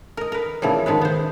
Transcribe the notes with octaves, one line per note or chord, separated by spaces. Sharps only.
A#4 D#5
A#4 B4
A#2 C#3 E3 F3 G3
D#3 F3 G#3 B4
B3 C5